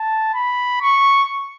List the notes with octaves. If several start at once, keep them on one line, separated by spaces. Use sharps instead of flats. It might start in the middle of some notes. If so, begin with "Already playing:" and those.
Already playing: A5
B5
C#6